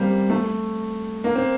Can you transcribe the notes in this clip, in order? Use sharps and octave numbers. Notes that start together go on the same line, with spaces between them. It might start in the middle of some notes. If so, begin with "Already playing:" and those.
Already playing: G3 A#3 C4
A3
A#3
C4